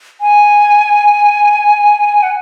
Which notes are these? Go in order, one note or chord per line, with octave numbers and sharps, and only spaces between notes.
G#5
F#5